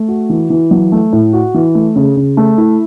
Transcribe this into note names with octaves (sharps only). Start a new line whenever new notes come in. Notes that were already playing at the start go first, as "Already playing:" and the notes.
Already playing: A3
F#4
E3
E3
F#3
A3
A2
F#4
E3
A3
C#3
C#3
A3
E4